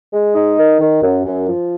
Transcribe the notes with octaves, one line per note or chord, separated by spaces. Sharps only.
G#3
D#4
D#3
D#3
F#2
F#2
F3